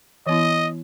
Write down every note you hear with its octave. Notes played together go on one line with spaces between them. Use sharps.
E3 B3 E4 D#5